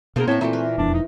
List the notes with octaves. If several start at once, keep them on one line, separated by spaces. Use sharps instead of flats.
B2 A#3 B3 D4 G#4 A#4 C5
A2 C4 C5 C#5 E5 A5
A#2 E3 A3 D#4 F#4
A#4 B4
E1 F2 D4
D#4